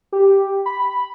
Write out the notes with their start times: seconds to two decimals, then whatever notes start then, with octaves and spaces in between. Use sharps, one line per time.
0.12 G4
0.66 B5